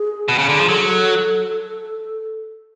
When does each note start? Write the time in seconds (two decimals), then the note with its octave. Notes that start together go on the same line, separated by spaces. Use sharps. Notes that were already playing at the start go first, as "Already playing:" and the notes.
Already playing: G#4
0.28 B2
0.38 C#3
0.49 D3
0.59 F3
0.68 F#3 A4